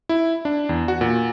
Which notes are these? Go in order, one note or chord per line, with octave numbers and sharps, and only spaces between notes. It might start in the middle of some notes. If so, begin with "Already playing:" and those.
E4
D4
E2
F#4
A#2